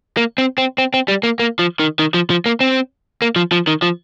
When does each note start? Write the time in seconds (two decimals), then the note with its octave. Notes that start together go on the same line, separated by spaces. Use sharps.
0.17 A#3
0.38 C4
0.58 C4
0.78 C4
0.94 C4
1.08 G3
1.23 A#3
1.39 A#3
1.59 F3
1.79 D#3
1.99 D#3
2.14 F3
2.30 F3
2.46 A#3
2.61 C4
3.22 A#3
3.36 F3
3.52 F3
3.67 D#3
3.82 F3